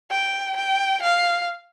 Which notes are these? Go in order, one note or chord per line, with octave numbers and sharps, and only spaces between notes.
G5
G5
F5